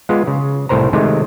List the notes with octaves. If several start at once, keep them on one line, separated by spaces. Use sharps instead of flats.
G#3 B3 F4
C#3
C2 A2 A#4 C5 A#5
C3 D#3 G#3 A3